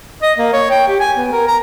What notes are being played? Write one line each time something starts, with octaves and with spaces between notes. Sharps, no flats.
D#5
A#3
C#5
G5
G4
G#5
B3
A#4
A#5